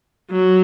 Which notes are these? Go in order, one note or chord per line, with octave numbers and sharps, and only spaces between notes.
F#3